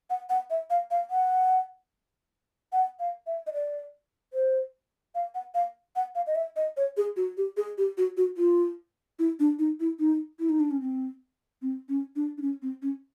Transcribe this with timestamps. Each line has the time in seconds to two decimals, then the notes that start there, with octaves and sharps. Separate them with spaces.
0.10 F#5
0.30 F#5
0.50 E5
0.70 F5
0.91 F5
1.11 F#5
2.72 F#5
3.00 F5
3.27 E5
3.47 D#5
3.53 D5
4.33 C5
5.15 F5
5.35 F#5
5.54 F5
5.96 F#5
6.15 F5
6.27 D#5
6.35 E5
6.56 D#5
6.77 C#5
6.97 G#4
7.17 F#4
7.37 G4
7.57 G#4
7.78 G4
7.98 F#4
8.17 F#4
8.37 F4
9.19 E4
9.40 D4
9.59 D#4
9.80 E4
9.99 D#4
10.40 E4
10.49 D#4
10.60 D4
10.71 C#4
10.81 C4
11.62 C4
11.89 C#4
12.16 D4
12.38 D4
12.42 C#4
12.62 C4
12.82 C#4